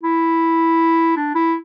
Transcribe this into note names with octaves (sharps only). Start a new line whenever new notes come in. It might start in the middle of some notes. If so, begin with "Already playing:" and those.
E4
D4
E4